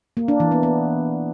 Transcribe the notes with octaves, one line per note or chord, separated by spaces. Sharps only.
A#3
D4
E3
B3
B3